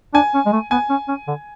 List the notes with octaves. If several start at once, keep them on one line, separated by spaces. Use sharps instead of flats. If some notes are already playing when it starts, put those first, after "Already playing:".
D4 G#5
C#4
G#3
A3
B3 G#5
C#4
C#4
D3